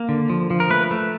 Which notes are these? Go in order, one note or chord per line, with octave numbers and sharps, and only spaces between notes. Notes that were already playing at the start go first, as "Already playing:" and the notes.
Already playing: A#3
D3
F3
F3
A#4
A3 B4
A3